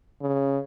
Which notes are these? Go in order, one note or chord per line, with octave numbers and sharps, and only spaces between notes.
C#3